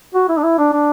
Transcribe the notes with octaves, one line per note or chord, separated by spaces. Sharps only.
F#4
E4
D4
E4
D4
D4